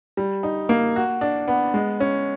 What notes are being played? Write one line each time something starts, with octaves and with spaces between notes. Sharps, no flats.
G3
D#4
A#3
F#4
D4
B3
G#3
C#4